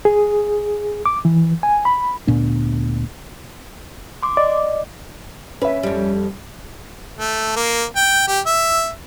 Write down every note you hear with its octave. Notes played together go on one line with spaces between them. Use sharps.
G#4
D6
E3
G#5
B5
D2 A#2 B3 D4
C6 D6
D5 D#5
C#4 B4 E5
F2 G3
A3
A#3
G5
G4
E5